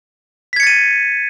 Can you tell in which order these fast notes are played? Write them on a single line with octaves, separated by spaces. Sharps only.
B6 G#6 C#7 A6 D#7